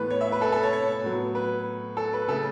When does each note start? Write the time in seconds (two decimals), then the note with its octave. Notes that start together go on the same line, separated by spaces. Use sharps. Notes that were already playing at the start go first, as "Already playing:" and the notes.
Already playing: A2 E3 B3 B4
0.10 C#5
0.21 E5
0.32 B4
0.41 A4
0.52 A4
0.63 C#5
0.73 C#5
1.04 A2 F#3 B3
1.35 B4
1.97 A4
2.13 B4
2.28 C#3 A3 A4